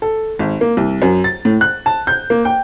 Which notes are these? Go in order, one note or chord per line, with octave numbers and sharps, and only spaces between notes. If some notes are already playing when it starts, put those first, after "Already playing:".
A4
G#1
A#3
C2
F#2
A6
A2
F#6
A5
G6
A#3
G5